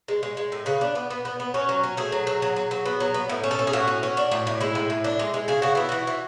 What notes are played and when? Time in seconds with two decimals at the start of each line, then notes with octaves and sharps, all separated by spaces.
0.08 G#3
0.23 G#3
0.37 G#3
0.52 A2
0.66 C#3 B4
0.81 D4
0.95 B3
1.10 B3
1.25 B3
1.40 B3
1.54 C#4 F#4
1.69 F#3
1.83 C#4
1.97 A3 G#4
2.12 F#3
2.27 F#3
2.42 F#3
2.56 F#3
2.71 F#3
2.86 B3
3.00 F#3
3.14 B3
3.29 A2
3.44 C#4
3.51 A4
3.59 C#4
3.67 G#4
3.73 A2 F#4
3.87 C#4
4.03 C#4
4.17 D4
4.31 A2
4.47 A2
4.61 G#3 E4
4.75 A2
4.90 A2
5.04 D4
5.19 G#3
5.34 G#3
5.48 C#3 G#4
5.62 C#3 F#4
5.75 B3 E4
5.89 E3 F#4
6.07 E3